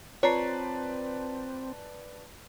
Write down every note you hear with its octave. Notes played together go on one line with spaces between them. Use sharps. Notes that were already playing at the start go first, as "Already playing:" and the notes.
C4 F4 B4 C#5 D5 A5 A#5 C7